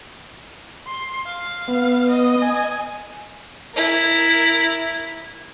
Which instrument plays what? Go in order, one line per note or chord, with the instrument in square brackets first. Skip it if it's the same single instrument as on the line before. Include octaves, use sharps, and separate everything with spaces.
[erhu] C6
F5
[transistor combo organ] B3
[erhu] D#5
[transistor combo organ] G#5
[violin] E4 A#4